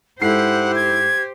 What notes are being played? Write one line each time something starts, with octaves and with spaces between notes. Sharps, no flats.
G#2 E4 G4 A4 C5 F#5 C7
G#6